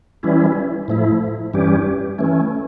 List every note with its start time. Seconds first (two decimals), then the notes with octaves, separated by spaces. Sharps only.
0.23 E3 G3 C#4 E4
0.88 A2 F3 A3 E4
1.53 G2 E3 G3 C#4 G4
2.18 E3 A3 C#4